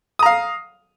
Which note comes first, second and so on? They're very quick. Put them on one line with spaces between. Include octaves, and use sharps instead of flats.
D#6 A#5 F5